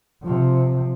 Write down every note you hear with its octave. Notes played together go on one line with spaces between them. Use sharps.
C3 F3